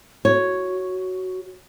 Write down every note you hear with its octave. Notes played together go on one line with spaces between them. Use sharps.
F#4 C#5